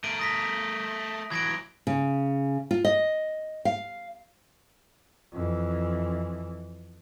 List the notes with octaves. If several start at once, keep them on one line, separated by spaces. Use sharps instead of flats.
A3 A#4 D7 D#7
D#6 A#6 B6
E3 F#3 G#6 A#6 D7
C#3
F4
D#5
F5
F2 E3